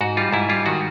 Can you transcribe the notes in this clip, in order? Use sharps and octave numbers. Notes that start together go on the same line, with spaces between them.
G#2 F#4
G3 F4
G#2 E4
G3 F4
D#3 F#4